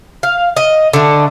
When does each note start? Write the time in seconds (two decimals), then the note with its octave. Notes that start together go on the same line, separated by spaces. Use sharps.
0.23 F5
0.57 D#5
0.93 D3 A3